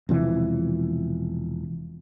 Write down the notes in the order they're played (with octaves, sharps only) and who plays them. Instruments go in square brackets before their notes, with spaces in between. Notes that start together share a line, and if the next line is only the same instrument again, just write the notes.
[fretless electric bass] E1 C3 E3 F3